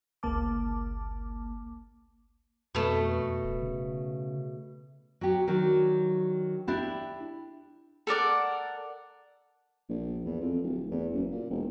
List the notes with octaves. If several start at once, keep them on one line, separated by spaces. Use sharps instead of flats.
G1 C#2 A#3 A5 D6
F2 B2 A3
D1
C#3
F#3 G4
D#3 F#3 D4
D4 E4 G4
A4 A#4 D5 F#5
A#1
E2
F2
D1
E2
F#1
A#2
E1